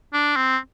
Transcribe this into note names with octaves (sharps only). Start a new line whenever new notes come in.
D4
C4